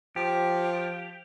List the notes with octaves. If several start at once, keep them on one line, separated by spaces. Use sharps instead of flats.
F3 G4